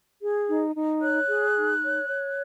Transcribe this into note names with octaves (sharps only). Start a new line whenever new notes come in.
G#4
D#4
D#4
C#5 F#6
G#4
D#4
C#5
C#5